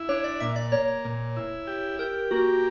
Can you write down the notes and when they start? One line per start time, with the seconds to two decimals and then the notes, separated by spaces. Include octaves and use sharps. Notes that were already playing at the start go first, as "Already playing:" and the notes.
Already playing: E4
0.09 D4 C#5
0.24 D5
0.40 A#2 E5
0.56 D5
0.72 A#3 C#5
1.05 A#2
1.37 E4
1.67 G4
1.99 G4 A#4
2.31 A#3 F#4